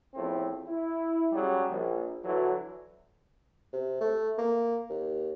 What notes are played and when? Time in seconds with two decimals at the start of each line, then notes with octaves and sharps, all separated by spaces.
0.14 E2 A2 F3 C4
0.68 E4
1.32 C#3 F#3 G3
1.68 A#1
2.24 D3 E3 F#3
3.73 C3
4.01 A3
4.38 A#3
4.90 D#2